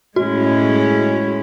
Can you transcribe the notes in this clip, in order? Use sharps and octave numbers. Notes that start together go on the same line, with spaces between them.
A2 G#3 C#4 E4 F#4